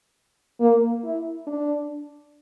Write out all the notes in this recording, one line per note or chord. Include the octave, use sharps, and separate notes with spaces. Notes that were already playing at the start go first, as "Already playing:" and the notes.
A#3
E4
D4